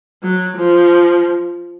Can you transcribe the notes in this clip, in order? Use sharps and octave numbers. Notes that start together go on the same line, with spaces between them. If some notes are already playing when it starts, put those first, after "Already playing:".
F#3
F3